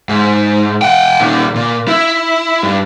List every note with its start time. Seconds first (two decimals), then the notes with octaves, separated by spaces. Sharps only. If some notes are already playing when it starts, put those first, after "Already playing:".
0.09 G#2
0.82 F#5 G5
1.20 A#2 D#3
1.55 A#2
1.88 E4
2.63 G2